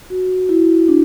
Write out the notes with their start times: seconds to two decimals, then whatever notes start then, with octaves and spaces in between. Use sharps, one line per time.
0.10 F#4
0.49 E4
0.88 D4